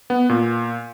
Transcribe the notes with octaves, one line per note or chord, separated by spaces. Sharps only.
B3
A#2